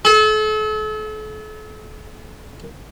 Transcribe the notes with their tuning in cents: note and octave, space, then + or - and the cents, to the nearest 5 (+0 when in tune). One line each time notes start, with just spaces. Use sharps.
A4 -40